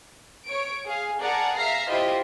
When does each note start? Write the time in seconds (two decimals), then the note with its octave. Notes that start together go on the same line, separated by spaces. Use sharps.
0.46 C#5 D7
0.86 G#4 F5
1.20 G#4 A#4 D5 F#5 A5 A#5
1.57 E5 F5 A#5 A#6 C7
1.89 E4 F4 G4 C5 D#5 E5